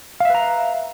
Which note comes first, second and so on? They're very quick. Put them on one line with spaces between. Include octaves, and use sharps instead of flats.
F5 E5 B4 A#5